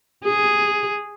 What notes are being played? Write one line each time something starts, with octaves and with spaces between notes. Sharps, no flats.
G#4